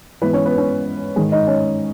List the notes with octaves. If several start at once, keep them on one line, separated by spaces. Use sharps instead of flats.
G#2 E3 B3 B4
C#4 C#5
B3 B4
C#4 C#5
G#2 D#3 G#4
D#4 D#5
C#4 C#5